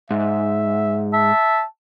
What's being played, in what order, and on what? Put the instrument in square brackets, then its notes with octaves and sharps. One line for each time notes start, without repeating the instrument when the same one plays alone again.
[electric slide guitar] G#2 [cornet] E5
[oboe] E5 [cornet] A5